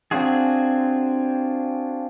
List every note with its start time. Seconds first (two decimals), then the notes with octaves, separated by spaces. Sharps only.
0.11 C4 D4 F4 F#4 G#4